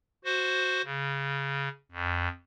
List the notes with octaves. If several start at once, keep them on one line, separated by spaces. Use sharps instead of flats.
F#4 C5
C#3
F2